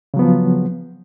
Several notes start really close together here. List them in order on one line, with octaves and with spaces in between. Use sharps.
C#3 F#3 B3 F3